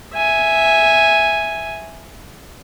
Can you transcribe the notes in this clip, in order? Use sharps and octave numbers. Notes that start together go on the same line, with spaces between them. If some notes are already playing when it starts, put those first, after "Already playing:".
E5 G#5